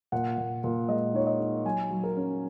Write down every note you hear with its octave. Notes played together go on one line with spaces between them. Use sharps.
A#2 F#5
A#2
A#2
G#3 D#5
D#4 C#5
D#5
D#4
F#3 G#5
F#3
A#4
C#4